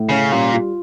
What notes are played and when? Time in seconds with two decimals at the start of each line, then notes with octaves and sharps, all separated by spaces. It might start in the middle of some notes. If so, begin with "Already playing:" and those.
Already playing: A2
0.09 C#3 C#4
0.32 A#2 G3
0.54 F4